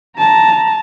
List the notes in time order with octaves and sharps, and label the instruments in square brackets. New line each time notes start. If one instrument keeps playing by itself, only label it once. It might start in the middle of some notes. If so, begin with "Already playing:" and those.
[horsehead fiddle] A5 A#5